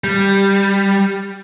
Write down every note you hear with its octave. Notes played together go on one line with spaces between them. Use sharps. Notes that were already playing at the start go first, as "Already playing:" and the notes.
G3